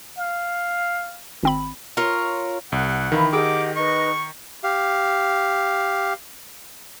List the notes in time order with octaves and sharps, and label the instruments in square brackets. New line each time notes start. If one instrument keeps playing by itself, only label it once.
[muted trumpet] F5
[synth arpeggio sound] G#1 C4 B5
[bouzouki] F4 A#4 C#5
[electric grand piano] C2 [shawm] F#5
[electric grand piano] D#3 [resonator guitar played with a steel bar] E3 E4 [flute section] B4 F5
[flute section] G4 D#5 F#5 [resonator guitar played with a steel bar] G#4 A#4 G5 [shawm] D6
[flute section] D#4 B4 D#5 [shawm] C#6
[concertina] G4 F5